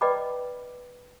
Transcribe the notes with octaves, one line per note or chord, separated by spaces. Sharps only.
B4 D5 D#5 G5 B5 D6